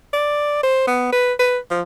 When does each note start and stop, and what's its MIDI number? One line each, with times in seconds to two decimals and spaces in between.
0.13 0.58 74
0.63 0.86 72
0.87 1.10 59
1.12 1.33 71
1.39 1.58 71
1.70 1.81 53